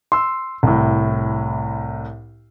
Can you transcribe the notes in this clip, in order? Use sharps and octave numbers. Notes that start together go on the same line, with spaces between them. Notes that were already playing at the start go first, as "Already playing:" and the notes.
C6 E6
C2 A2